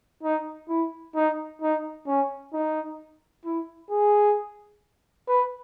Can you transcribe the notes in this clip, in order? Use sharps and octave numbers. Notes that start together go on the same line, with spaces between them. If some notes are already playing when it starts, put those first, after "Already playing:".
D#4
E4
D#4
D#4
C#4
D#4
E4
G#4
B4